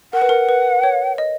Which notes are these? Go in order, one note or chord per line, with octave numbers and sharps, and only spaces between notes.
A#4 F#5
B4
A#4
B4
C#5
D#5